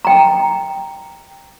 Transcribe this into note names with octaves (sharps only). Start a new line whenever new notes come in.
G5 A#5